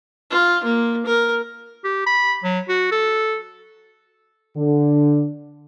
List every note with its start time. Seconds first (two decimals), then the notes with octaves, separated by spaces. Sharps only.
0.31 F4
0.64 A#3
1.06 A#4
1.84 G4
2.06 B5
2.44 F#3
2.69 F#4
2.91 A4
4.56 D3